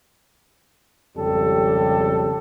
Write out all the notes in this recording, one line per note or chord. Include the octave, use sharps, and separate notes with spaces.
G#1 F2 C#3 G3 G4 A4